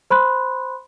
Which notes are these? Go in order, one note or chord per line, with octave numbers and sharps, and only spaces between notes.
C5 B5 C6 F#6